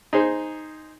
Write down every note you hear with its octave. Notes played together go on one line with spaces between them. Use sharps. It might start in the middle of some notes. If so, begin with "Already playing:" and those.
D#4 G#4 C5